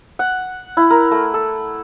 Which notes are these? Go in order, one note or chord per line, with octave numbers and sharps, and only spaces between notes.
F#5
E4
A#4
A3
A4